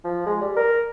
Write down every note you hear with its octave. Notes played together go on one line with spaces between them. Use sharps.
F3
G#3
G3
A#4